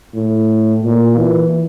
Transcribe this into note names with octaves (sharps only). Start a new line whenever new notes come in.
A2
A#2
E3